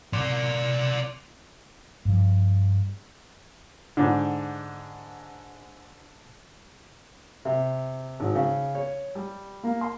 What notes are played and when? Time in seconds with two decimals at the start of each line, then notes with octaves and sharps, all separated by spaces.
0.13 D5 C6
2.05 G2 F3
3.97 G#2 D3
7.45 C3
8.20 G#1
8.35 C#3
8.75 C#5
9.15 G3
9.64 A#3
9.81 C6